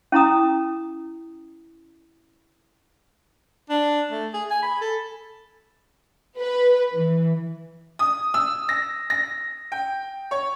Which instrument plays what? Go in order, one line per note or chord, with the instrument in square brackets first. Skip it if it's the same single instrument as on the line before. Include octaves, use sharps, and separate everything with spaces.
[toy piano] C#4 E4 A#5 D#6
[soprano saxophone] D4
A3
G#4
G#5
B5
A4
[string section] B4
E3
[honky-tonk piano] D#6
E6
A#6
A#6
G5
C#5